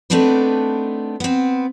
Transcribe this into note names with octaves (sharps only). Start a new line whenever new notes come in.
A3 B3 C4 D4 D#4 B4
B3 C4